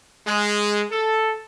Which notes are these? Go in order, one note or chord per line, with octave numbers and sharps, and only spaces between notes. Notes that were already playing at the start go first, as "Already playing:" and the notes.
G#3
A4